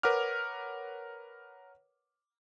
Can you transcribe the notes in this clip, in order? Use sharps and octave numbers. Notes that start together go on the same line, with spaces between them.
A#4 B4 C#5 F#5 D6 F6